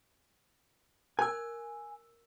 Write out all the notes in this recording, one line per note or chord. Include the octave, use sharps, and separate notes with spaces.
A#4 G#5 E6